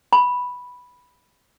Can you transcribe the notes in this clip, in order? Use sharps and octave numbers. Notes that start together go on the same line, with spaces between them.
B5